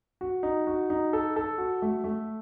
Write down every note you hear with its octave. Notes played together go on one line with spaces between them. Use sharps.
F#4
D#4
F#4
D#4
A4
A4
F#4
A3
A3